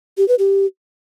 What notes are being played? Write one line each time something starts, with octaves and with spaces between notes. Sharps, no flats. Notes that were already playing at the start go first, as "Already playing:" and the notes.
G4
B4
G4